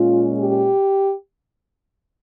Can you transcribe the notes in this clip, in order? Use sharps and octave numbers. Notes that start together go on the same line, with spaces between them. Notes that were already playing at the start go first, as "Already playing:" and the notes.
Already playing: A#2 G#3 C#4 F4
G4